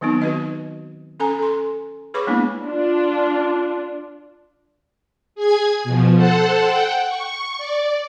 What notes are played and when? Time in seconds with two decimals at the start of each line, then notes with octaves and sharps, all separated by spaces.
0.01 D#3 F#3 B3 C4 D#4
0.22 F#4 B4 D#5
1.20 C#4 A4 G#5 A#5
1.39 A4 C6
2.14 G#4 B4 C#5 B5 C#6 D6
2.27 G#3 A#3 B3 D4 E4
2.63 D4 F4
5.35 G#4 G#5 G#6
5.84 B2 F3
6.16 A4 C5 F#5 A5
6.64 F#5 G5
7.07 C#6
7.58 D5